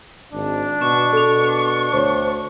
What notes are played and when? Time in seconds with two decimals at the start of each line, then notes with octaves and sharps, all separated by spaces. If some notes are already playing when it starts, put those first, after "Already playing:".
0.33 G#1 D4
0.81 B2 C#6 E7
1.13 B2 A4 F7
1.93 D2 C5 C#5